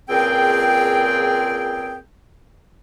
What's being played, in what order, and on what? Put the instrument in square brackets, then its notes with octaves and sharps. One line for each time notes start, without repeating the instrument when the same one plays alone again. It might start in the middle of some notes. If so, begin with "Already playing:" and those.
[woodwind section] C#2 A#2 C4 G#4 G5